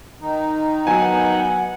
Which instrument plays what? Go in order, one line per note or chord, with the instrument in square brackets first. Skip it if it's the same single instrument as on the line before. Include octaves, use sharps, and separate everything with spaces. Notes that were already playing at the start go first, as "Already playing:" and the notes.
[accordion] D#3 D#4
[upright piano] F#3 G#5 [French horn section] B3 [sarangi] F#5